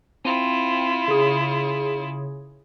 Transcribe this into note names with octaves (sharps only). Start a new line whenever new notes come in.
C4 E4 F4 D#7
C#3 G#4